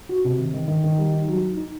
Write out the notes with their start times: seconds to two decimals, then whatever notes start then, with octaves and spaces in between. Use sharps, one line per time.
0.09 F#4
0.24 C3
0.38 D#3
0.53 D#3
0.68 D#3
0.84 D#3
0.98 G3
1.13 D#4
1.28 F#3
1.42 D#4
1.57 D#4